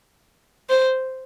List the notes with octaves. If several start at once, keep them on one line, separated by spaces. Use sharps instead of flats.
C5